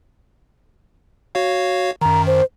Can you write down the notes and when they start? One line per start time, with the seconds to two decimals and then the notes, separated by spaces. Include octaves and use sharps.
1.35 F#4 C#5 F5
2.01 F#2 D#3 A#5
2.27 C5